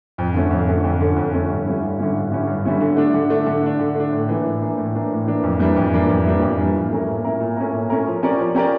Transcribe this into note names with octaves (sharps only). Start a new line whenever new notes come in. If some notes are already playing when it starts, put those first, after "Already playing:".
F2
D3 A3 C#4
F2
D3 A3 C#4
F2
D3 A3 C#4
F2
D3 A3 C#4
G2
D3 G3 C#4 E4
G2
D3 G3 C#4 E4
G2
D3 G3 C#4 E4
G2
D3 G3 C#4 E4
D3
A3 D4
D3
A3 D4
D3
A3 D4
D3
A3 D4
A2
E3 A#3 D4
A2
E3 A#3 D4
A2
E3 A#3 D4
A2
E3 A#3 D4
F2
E3 G3 A#3 D4
F2
E3 G3 A#3 D4
F2
E3 G3 A#3 D4
F2
E3 G3 A#3 D4
A#2
A3 C#4 E4 A#4
A#2
A3 C#4 E4 A#4
A#2
A3 C#4 E4 A#4
A#2
A3 C#4 E4 A#4
F3
C#4 G4 A#4 D5
F3
C#4 G4 A#4 D5